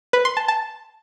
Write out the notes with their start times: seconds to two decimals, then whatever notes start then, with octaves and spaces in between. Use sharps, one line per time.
0.13 B4
0.25 C6
0.37 A5
0.48 A5